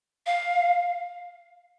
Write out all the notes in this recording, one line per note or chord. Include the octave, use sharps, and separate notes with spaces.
F5